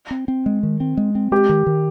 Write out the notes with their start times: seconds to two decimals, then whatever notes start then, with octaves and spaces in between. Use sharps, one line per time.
0.11 C4
0.28 C4
0.46 G#3
0.63 D#3
0.80 C4
0.97 G#3
1.15 C4
1.32 G#3 G4
1.49 D#3
1.67 D#3